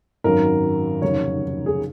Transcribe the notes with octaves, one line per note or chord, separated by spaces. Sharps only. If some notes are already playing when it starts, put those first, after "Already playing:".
G#1 F#2 D#3 F#3 A#4
F1 D#2 C#3 F#3 C#5
G#4